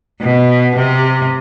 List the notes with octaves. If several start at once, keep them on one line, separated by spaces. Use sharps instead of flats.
B2
C3